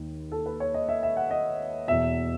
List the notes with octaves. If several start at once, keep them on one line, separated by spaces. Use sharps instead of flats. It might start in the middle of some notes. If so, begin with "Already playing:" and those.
Already playing: D#2 D#3
A4
B4
C#5
D#5
E5
E5
F#5
D#5
E2 B2 E5